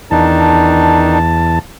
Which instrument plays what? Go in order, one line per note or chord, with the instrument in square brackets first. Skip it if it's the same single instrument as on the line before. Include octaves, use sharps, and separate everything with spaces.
[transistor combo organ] E2 A5 [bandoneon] D#3 D4 D#4